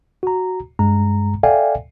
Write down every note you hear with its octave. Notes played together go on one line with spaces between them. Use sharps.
F#4 A#5
G2 G#3 A#5
A4 D5 E5 F5 G5 G#5